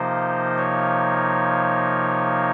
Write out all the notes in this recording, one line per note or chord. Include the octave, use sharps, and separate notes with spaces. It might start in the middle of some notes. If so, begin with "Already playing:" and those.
Already playing: C3 F3 A#3 D#4 C5
C#5